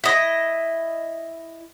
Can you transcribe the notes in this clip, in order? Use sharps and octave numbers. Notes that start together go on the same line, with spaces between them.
E4 D#5